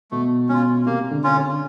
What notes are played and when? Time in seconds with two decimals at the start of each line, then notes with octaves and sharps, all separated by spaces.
0.11 B2 A3
0.49 B2 C#4 F4
0.86 C3 A#3
1.11 D3
1.24 C#4 F4
1.36 D3